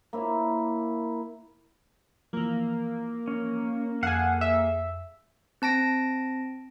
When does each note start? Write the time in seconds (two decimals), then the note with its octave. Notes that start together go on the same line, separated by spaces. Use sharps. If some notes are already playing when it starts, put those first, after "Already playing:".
0.13 A#3 E4 C#5
2.33 E3 F3 A#3
3.28 C#4
4.03 F2 G#4 A4 F5 F#5 G#5
4.41 E5
5.62 C4 A5 A#6 D7